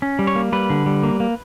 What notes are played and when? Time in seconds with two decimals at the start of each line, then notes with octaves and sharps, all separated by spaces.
0.02 C#4
0.19 G3
0.27 C#5
0.35 A#3
0.52 G3 B4
0.70 D3
0.86 G3
1.03 A#3
1.20 A#3